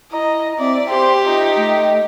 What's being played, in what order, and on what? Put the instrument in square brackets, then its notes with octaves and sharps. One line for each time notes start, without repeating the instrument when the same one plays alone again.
[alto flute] E4 [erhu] D#5 [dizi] A#5
[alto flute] C4 [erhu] D5 [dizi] E5
[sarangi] G4 [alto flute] C5 [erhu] C6
[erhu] D#4 [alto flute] F4
[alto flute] A3 [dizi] D#5